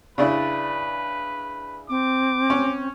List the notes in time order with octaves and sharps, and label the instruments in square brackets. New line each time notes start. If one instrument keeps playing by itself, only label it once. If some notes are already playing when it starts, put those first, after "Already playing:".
[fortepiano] C#3 D4 E4 [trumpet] B4
[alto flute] C4 [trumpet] D6
[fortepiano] C#4